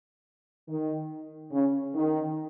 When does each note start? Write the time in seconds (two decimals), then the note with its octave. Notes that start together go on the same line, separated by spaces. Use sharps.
0.68 D#3
1.52 C#3
1.94 D#3